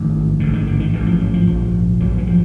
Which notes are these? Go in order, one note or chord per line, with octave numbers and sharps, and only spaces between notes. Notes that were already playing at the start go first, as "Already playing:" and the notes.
Already playing: A1 G#2 D#3
A1 G#2 D3
D#3
D3
D#3
A1 G#2 E3
F3
F#3
F3
A#1 G#2
A#1 G#2 F#3
E3
F3